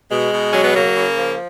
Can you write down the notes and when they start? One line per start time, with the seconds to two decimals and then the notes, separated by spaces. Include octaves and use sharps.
0.11 B2 G#3
0.32 B2
0.50 F#3 C#4
0.62 B3
0.75 C#3 A#3
0.96 C#3
1.17 F3